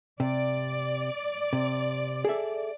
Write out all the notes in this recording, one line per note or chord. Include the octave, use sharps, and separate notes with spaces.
C3 D5
C3
G#4 A4 E5